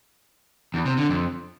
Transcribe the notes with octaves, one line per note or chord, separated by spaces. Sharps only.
E2
C3
D3
F2